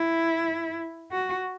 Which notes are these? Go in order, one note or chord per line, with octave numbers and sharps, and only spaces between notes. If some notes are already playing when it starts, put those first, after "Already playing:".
Already playing: E4
F#4